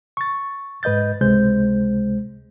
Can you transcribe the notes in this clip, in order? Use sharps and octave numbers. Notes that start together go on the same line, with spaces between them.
C#6 A6
G#2 B4 D#5 G6 A6
C#2 C3 G#3 C5 G6